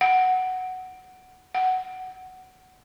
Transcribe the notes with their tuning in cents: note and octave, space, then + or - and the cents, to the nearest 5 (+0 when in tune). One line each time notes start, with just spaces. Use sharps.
F#5 +5
F#5 +10